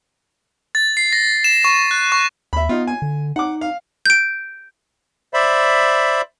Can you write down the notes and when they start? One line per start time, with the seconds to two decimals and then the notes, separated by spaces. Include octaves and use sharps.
0.75 A6
0.97 C7
1.13 A#6
1.44 E7
1.64 C#6
1.91 F#6
2.12 C#6
2.53 D#2 E5 B5
2.69 B3 D#4 F4
2.87 G#5
3.02 D3
3.36 D#4 F#5 D6
3.61 F5
4.06 G6 D7
5.34 C5 D5 E5 B5